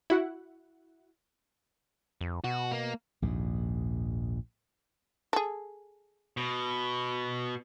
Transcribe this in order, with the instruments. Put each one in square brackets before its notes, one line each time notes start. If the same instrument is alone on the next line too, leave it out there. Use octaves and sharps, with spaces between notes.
[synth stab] E4 F#4 F#5
[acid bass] F2
[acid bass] B2 [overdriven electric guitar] F#4
[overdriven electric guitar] A#3
[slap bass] A#1 D#2 G#2
[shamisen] G#4 A4
[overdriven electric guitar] B2